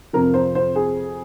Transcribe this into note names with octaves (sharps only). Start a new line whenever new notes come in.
F2 C3 F3 A#4
C5
C5
G#4